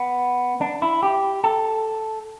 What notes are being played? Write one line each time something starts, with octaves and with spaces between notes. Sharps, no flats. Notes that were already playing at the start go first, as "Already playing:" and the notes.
Already playing: B3
D4
E4
G4
A4